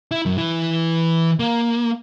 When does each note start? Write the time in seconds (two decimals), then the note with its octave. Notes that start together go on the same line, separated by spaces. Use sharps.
0.11 E4
0.26 F#2
0.38 E3 E4
1.40 A#3